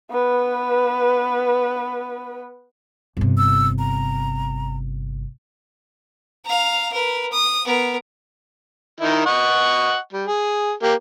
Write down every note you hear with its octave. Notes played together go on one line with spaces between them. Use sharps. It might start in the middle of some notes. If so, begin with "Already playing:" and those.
B3 B4
G1 C3
E6
A#5
F5 A#5
A#4 B4
D#6
B3 A#4
D#3 D#4 E4
D#5 F#5 C#6
G3
G#4
A#3 G4